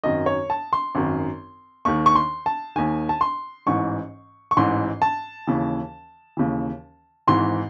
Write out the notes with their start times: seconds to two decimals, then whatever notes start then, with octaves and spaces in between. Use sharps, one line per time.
0.04 G#1 F#2 D#3 D#5
0.26 C#5
0.50 A5
0.73 C6
0.95 G#1 F#2 D#3
1.85 D#2 D#3 C#6
2.06 C#6
2.15 C6
2.46 A5
2.76 D#2 D#3 G#5
3.09 A5
3.21 C6
3.66 A1 G#2 E3 C#6
4.51 C#6
4.57 A1 G#2 E3 C6
5.02 A5
5.47 D#2 C#3 E3
6.37 D#2 C#3 E3
7.27 G#1 G#2 E3 C6